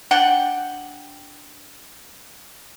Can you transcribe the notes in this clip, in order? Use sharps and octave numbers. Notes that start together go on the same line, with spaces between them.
D4 F#5 G5